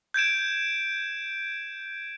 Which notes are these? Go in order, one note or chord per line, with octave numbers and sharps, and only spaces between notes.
G6 G#6 D7 E7